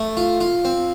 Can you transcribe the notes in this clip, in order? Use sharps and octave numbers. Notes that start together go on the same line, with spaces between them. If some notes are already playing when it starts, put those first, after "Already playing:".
Already playing: A3
F4
F4
C4